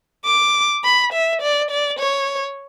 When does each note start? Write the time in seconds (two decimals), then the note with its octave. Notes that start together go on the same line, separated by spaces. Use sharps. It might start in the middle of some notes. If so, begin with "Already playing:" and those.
0.25 D6
0.84 B5
1.13 E5
1.42 D5
1.71 D5
1.99 C#5